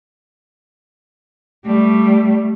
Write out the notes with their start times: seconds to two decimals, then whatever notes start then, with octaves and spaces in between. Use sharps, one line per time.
1.65 G3 A3